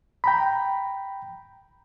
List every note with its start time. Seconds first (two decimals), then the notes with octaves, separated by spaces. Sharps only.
0.24 G5 A#5 B5